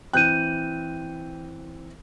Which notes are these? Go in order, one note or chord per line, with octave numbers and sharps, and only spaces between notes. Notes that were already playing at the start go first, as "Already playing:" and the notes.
E3 C4 G5 F#6 G6 D#7